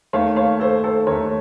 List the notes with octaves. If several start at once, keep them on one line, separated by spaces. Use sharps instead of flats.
D#2 D#3 A3 C#5 F5
C#5 F5
A4 C5
A4 C5
D#2 D#3 A3 A#4 C#5